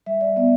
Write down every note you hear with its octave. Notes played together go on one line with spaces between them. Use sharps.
G3 E5
G3 D5
B3 D5